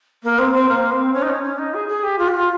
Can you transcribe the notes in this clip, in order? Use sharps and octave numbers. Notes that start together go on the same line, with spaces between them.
A#3
C4
C4
A#3
C4
C#4
D#4
C#4
C#4
D#4
G#4
G#4
G4
F4
G4
F4